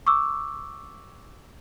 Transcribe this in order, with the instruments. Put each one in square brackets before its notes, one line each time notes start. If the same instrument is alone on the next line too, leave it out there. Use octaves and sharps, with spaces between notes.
[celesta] C#6 D6 E6